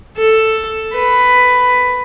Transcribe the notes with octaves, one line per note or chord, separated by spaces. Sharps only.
A4
B4